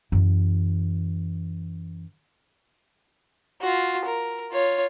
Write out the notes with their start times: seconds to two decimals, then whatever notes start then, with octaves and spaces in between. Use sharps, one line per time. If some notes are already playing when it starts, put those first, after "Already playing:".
0.12 F#2 E3
3.61 F4 F#4
4.05 A#4
4.52 F4 C#5